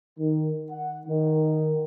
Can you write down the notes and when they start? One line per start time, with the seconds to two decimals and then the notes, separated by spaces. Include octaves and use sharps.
0.17 D#3
0.70 F#5
1.06 D#3